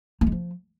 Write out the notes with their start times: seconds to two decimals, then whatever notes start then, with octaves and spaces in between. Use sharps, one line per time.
0.21 A#3
0.27 G#3
0.32 F3